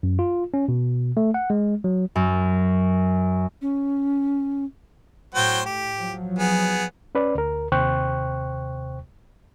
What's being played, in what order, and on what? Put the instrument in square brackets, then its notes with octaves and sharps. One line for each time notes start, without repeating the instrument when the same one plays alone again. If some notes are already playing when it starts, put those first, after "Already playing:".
[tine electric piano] F#2
F4
C#4
B2
A3
F#5
G#3
F#3
[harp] F#2
[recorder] C#4
[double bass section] A2 [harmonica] F#3 C5 G5
[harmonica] G4
[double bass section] F3 F#3
[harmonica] B3 G#4
[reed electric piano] C#4 B4 D5
D2 A#4
D#2 C3 C5 G5 C#6 F#6